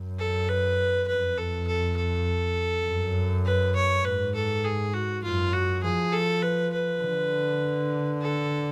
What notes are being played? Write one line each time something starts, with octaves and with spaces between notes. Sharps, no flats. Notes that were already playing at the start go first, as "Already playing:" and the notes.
Already playing: F#2
A4
B4
F2 B4
A4
A4
A4
F#2
B4
C#5
G#2 B4
A4
G#4
F#4
F#2 F4
F#4
F3 G#4
A4
B4
B4
D3
A4